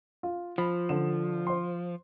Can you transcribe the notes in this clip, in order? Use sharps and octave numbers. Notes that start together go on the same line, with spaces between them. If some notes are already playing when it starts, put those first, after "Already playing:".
F4
F3 B5
D3 E7
C5 C6